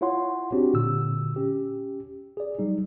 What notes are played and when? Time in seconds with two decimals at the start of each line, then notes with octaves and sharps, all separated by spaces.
0.01 E4 F4 C#5 F#5 C6
0.52 C4 D4 F#4 G4
0.74 A#2 D3 E6
1.36 C#4 G4
2.37 G#4 D5
2.59 F#3 G3 D#4